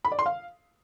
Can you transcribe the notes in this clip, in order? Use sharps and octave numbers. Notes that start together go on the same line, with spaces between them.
B5
D5
C6
F5